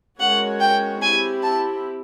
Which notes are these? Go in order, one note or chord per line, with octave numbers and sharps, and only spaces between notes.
G#3 C#4 F#4 A#4 C#5 F#5
G5
C4 E4 G4 G#5
A5